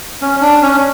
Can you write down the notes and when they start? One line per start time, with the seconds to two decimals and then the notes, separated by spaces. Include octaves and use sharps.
0.22 C#4
0.41 D4
0.62 C#4